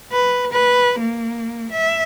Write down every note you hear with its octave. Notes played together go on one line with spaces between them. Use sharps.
B4
B4
A#3
E5